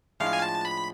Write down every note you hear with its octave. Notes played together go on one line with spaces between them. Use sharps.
A2 F3 G#3 D4 F4 F5
G#5
A5
B5